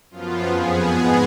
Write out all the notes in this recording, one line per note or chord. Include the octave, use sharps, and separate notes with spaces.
F#2 F3 B3 F4
F2 F3 B3 G#4
G#2 G#3 B3 G#4